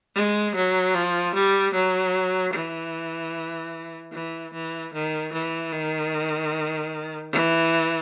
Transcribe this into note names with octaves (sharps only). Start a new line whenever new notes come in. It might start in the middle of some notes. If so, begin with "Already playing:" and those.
G#3
F#3
F3
G3
F#3
E3
E3
E3
D#3
E3
D#3
E3